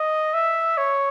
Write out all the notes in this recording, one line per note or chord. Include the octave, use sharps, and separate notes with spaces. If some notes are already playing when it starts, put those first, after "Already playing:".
Already playing: D#5
E5
C#5